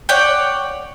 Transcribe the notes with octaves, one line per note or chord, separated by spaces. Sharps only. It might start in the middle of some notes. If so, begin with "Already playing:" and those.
C#5 D5 F#5 G5